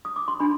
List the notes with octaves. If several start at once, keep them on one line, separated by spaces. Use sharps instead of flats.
D#6
D6
C6
D4 B5